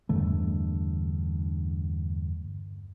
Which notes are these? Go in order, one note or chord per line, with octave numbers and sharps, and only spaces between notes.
E2 G2 D3 A3